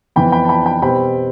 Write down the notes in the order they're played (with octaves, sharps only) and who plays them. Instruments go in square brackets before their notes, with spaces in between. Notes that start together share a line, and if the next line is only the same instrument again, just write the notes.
[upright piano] F2 E3 B3 G5 B5
G5 B5
A5
G5 B5
G5 B5
B2 G3 C4 G5 B5